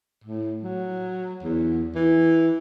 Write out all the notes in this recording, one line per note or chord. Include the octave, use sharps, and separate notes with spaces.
A2
F#3
E2
E3